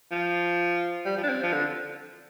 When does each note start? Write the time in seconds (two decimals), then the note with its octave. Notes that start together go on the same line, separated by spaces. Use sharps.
0.12 F3
1.05 G3
1.17 F3
1.23 D4
1.29 C4
1.43 F3
1.53 D3